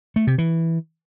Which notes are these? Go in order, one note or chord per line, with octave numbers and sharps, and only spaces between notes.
A3
C3
E3